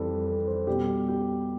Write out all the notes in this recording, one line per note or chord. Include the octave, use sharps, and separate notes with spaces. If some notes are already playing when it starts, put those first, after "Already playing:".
Already playing: F2 E3 G3 A4
A4
C5
B2 G3 G4
G4